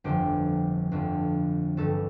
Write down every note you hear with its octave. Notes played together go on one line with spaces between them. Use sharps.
G1 F2 D3 F3 G4
G1 F2 D3 F3
A1 G2 D3 A4